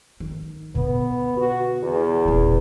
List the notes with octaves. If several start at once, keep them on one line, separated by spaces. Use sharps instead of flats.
D#3
B2 D3 B3
F#4
E2
D#1 D3